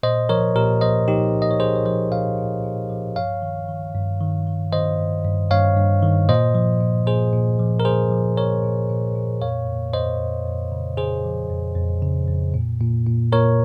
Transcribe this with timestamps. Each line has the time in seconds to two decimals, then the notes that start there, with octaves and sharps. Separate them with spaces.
0.03 A#2 C5 D#5
0.29 F3 A#4 C#5
0.56 A#2 G4 A#4
0.81 F3 C5 D#5
1.08 F3 D#4 G4
1.34 A#2
1.42 D#5
1.51 C#5
1.60 F3 G#4 C5
1.76 C#5
1.86 F3 C5 D#5
2.12 A#2 C#5 F5
2.38 A#2
2.64 A#2
2.90 F3
3.16 G2 C#5 F5
3.42 D#3
3.69 D#3
3.94 G2
4.21 D#3
4.47 D#3
4.73 D#3 C5 D#5
4.99 G2
5.24 G2
5.51 G2 C#5 F5
5.77 G2
6.03 D#3
6.29 A#2 C5 D#5
6.55 F3
6.81 A#2
7.07 A#2 G#4 C5
7.33 A#2
7.59 F3
7.80 A#4
7.85 F3 G#4 C5
8.11 F3
8.37 F3 A#4 C#5
8.63 A#2
8.89 A#2
9.16 A#2
9.42 F2 C#5 F5
9.67 F2
9.93 F2 C5 D#5
10.20 F2
10.46 F2
10.72 C#3
10.97 C#3 G#4 C5
11.24 F3
11.50 F2
11.76 F2
12.02 C#3
12.28 F2
12.54 A#2
12.80 A#2
13.07 A#2
13.32 A#2 A#4 C#5